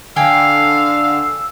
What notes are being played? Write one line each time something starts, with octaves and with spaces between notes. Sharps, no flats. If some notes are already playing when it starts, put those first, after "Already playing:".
D3 F5 G5 G#5 E6